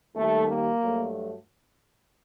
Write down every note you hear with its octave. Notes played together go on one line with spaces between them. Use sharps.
D#2 D#3 G3 A3
A#3
G2 F#3 A3